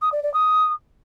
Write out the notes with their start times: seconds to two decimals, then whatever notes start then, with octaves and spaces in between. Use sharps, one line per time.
0.02 D#6
0.12 D5
0.23 D5
0.33 D#6